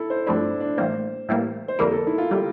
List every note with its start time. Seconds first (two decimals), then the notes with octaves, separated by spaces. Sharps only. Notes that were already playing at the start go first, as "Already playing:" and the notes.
Already playing: E4 A4
0.10 C5
0.26 G2 F3 A3 C4 D4 E4
0.61 D4
0.77 A2 E3 G3 A#3 C5
1.29 A2 E3 G3 A#3
1.68 C5
1.79 F2 D3 G3 A#3 E4 A#4
1.92 A4
2.07 E4
2.18 F4
2.31 D3 G3 A#3 E4 G4